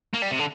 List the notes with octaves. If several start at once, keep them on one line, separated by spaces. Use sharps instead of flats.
A#3
G3
C3
D3